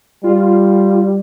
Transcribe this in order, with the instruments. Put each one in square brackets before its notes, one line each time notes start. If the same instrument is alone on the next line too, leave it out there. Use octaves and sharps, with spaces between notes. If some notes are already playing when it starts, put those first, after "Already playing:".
[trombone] G3 [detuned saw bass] F4